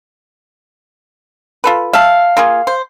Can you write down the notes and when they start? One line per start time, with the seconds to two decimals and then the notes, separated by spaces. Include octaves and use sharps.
1.64 F4 A4 B4
1.93 E5 F5 A5
2.37 A#3 F4 G#4
2.67 C5